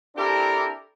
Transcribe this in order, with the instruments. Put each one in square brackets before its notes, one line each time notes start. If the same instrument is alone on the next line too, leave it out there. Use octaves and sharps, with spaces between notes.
[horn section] C4 D4 E4 G4 A4 A#4